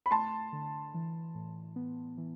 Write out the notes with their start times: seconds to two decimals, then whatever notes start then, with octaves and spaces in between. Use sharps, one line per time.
0.06 B5
0.11 A3 A5 C6
0.53 D3
0.94 E3
1.35 A2
1.76 B3
2.18 E3